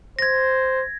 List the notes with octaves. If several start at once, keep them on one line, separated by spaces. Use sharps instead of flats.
C5 G#6 A#6